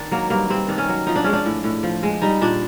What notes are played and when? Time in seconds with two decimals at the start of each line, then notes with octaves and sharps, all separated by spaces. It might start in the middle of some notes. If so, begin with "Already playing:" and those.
Already playing: D#3 D4
0.11 F#3 A#3
0.30 G2 A#3
0.49 G2 C4
0.68 D#3 D4
0.78 C#4
0.89 F#3
1.07 F3 D#4
1.16 D4
1.24 G#3 C#4
1.33 D4
1.46 A2
1.64 A2
1.83 F3
2.03 G#3
2.22 G3 D#4
2.41 A#2 D4